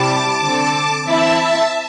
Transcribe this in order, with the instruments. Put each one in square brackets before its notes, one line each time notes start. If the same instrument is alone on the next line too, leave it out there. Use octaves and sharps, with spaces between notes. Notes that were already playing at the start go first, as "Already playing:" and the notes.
Already playing: [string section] C3 G3 E4 G4 [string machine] A5 D6
[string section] D3 C4 A4
[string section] E3 C4 E4 [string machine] E5 A5